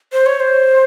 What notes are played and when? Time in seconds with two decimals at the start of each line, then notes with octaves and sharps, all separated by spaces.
0.13 C5
0.26 C#5
0.40 C5